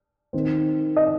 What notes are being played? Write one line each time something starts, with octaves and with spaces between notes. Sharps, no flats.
D#3 C4
D#5